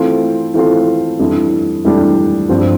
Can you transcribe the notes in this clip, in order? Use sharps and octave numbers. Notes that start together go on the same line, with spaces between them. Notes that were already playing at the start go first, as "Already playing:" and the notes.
Already playing: E3 A3 C4 F4
E3 A3 C4 F4
F2 E3 G3 D4
F2 E3 G3 D4
G2 F3 C4 G4